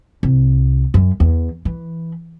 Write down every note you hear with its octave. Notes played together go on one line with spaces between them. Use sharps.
C2
F#2
E2
E3